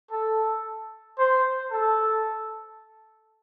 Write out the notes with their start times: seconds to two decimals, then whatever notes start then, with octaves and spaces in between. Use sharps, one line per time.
0.11 A4
1.18 C5
1.71 A4